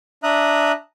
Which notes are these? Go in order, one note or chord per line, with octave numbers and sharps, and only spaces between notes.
D4 E5 A#5 D#6 F#6